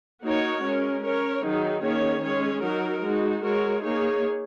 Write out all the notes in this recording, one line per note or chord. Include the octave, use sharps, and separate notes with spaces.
A#3 D#4 F#4 A#4 C#5
G#3 C#4 A#4
C#4 A#4 C#5
D#3 F#3 D#4 G#4
D#3 A#3 C#4 G#4 C#5
G#3 C#4 G#4 C#5
F#3 D#4 F#4 A#4
G#3 D#4 F#4
G#3 F#4 A#4 C#5
A#3 D#4 G#4 C#5